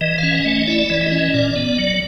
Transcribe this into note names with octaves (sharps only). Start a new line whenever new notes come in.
E3 D#5
F5
C#4
D#5
A3
D#5
E4 D5
E3
D#5
C#4
A#2 D5
B3
F#3